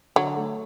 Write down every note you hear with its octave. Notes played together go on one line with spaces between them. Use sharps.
D3 F#3
A3